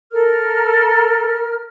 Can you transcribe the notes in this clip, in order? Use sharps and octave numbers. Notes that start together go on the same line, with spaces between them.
A4 A#4 F6